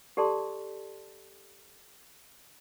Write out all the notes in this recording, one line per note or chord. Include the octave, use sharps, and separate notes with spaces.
G4 A4 D5 A5 C6